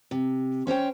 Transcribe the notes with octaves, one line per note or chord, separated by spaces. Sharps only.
C3
C#4 C5 C#5 G5